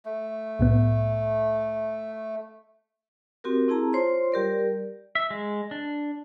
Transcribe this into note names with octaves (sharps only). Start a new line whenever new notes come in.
A3
C2 A2 B3
C4 F#4 G4 A#4
C4 E4 G#4 A5 A#5
F4 C5 C#5 C6
G3 G4 A#4 D5
E5
G#3
D4